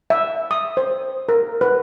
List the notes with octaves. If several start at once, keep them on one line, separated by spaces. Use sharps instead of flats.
E5
D#6
C5
A#4
B4